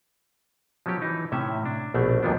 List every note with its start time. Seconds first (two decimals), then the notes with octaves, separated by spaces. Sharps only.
0.86 F3 F#3 B3 C#4 G4
1.02 E3 D#4
1.32 A2 C3 C#4 E5
1.65 D4
1.94 A#1 B2 A3 D4
2.23 D#2 A#2 F3 B3 D4